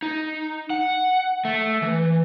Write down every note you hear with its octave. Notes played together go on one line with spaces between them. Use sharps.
D#4
F#5
A3
E3